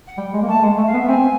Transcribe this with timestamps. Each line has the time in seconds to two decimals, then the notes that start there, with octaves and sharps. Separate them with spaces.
0.07 F#5
0.18 G3 G5
0.33 G#3
0.42 A#3
0.48 A3 A5
0.63 G#3 F#5
0.78 A3
0.86 F5
0.94 B3
0.97 E5
1.08 C4 G#5